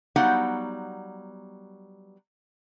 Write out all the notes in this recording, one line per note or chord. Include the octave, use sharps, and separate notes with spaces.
F#3 G3 B3 D#4 F5 F#5